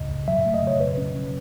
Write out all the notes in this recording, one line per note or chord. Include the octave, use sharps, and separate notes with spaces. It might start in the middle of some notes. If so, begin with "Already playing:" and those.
Already playing: C#2 F#2 C#3 D#5
F#2
F#3 E5
E5
A3
D#5
C#3 C#5
F#3 B4
C#4
F#3